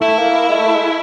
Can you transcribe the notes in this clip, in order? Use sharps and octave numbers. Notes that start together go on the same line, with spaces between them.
A3 E4
A#3
A#3
G#3
A3
G#3